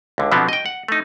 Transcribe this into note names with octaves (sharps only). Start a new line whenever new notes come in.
C#2 D3
B2 D3 F3 F#3 B3 C4
D#5 G5
F#5
A3 D#4